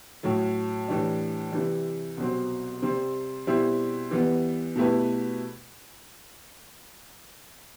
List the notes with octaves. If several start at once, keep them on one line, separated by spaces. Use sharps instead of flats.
A2 F#3 A3
A2 E3 G3 D4
C3 E3 G3
C2 B2 F#3 C4
C3 G3 C4
B2 G3 C4 E4 G4
E3 G3 B3
B2 A3 E4 G4 B4